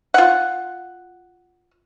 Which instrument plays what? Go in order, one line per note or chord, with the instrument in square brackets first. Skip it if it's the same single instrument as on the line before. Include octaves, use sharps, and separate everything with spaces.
[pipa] F4 F#5